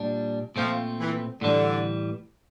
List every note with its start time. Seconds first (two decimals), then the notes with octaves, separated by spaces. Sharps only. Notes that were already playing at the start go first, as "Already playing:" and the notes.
Already playing: A#2 G3 D4
0.56 A#2 F3 A3 C4
0.99 E3
1.41 A2 D3 E3 G3